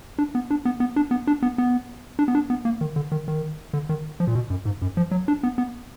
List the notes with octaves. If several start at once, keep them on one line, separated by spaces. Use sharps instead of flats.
D4
B3
D4
B3
B3
D4
B3
D4
B3
B3
D4
B3
D4
B3
A#3
D#3
D3
D#3
D#3
D3
D#3
F3
A#2
B2
F#2
G#2
F#2
F3
F#3
D4
B3
B3